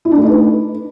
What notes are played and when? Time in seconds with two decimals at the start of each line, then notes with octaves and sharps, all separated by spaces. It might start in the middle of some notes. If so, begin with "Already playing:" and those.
0.05 E4
0.11 D4
0.17 A3
0.23 D#4
0.30 B4